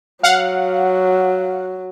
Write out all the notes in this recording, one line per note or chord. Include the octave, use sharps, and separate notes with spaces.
F#3 F5 F#5